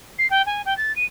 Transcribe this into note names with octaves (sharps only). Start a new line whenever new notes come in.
C7
G5
G#5
G5
A6
D#7